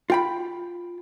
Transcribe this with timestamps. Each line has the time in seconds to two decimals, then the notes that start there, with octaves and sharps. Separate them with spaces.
0.10 F4 G5 B5